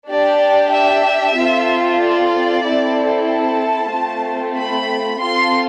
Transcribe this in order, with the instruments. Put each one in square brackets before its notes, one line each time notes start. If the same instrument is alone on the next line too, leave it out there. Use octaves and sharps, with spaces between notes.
[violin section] D4 G4 D5
E5
C4 F4 A4
D5
C4 E4 A4
A5
A3 C4 F4
B5
C4 F4 A4 C6